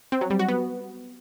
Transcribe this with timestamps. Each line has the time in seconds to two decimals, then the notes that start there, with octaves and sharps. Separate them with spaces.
0.12 C4
0.21 F#3
0.30 G3
0.39 F#4
0.49 B3